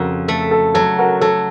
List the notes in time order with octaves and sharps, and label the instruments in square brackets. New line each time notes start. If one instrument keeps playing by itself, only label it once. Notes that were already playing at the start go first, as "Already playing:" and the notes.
Already playing: [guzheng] F2 C#3 [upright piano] F#4 A#4
[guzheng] A3 [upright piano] A4
[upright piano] A4
[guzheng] F#3 [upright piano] A4
[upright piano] F#4 A#4
[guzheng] F#3 [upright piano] A4